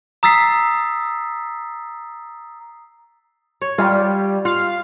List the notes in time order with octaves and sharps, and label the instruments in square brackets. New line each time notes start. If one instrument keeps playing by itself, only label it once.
[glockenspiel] A#5 D#6 E6 A6 B6 C7
[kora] C#5
[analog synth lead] G3 [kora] F4
[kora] F4 [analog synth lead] F5